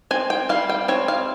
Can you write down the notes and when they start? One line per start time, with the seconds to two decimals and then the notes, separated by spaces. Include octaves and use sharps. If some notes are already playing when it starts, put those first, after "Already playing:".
0.11 C4 G#5
0.30 G5
0.49 G3 F5
0.69 G5
0.88 C4 C#5
1.08 F5